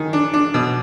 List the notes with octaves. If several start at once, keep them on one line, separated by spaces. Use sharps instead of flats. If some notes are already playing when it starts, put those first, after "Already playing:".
Already playing: D#3 G#4
D4
D4
B2